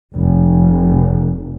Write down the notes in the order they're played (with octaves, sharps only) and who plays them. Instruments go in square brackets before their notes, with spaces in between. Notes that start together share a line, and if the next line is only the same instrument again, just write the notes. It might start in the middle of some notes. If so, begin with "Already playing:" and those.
[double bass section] F1